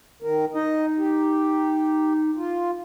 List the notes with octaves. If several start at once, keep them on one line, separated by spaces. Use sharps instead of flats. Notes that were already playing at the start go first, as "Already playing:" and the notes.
D#3 A#4
D#4 D#5
G4
F4